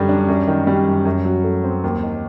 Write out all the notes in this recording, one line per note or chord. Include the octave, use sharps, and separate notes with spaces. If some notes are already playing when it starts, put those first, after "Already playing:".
Already playing: F#2 D3 G3
D4
F#2
D#3
G3
F#2
F#2
F#3
A3
C4
D#2
D#3